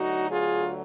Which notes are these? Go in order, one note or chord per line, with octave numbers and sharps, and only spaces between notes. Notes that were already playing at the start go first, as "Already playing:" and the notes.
Already playing: D2 D3 F#3 D#4 F#4
F4 G#4